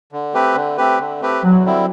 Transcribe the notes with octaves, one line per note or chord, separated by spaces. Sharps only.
D3
A3 C4 G4 B4
D3
A3 C4 G4 B4
D3
A3 C4 G4 B4
E2 F#3
D3 G3 C4 E4